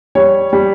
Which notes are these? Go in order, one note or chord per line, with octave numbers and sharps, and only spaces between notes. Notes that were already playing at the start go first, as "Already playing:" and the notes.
G3 C#5
G3